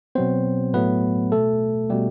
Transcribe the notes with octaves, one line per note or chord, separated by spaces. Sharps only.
B2 F#3 B3 C4 C5
A2 F#3 A3 B3 B4
B2 A3 A4
B2 G3 A3 G4